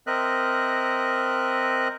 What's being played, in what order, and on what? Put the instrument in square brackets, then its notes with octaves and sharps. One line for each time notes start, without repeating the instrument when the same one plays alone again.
[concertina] C4 A#4 D#5 E5 F#6